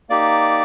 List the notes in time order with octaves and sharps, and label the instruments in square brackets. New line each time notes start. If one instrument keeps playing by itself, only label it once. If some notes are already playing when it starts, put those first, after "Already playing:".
[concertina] A#3 D#4 G4 D5